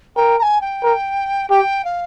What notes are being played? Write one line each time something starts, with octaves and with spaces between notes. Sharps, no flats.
A#4 G5
A#5
G#5
G5
A#4
G4 G5
F5